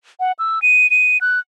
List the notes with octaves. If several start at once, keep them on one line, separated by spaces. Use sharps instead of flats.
F#5
E6
D#7
D#7
F#6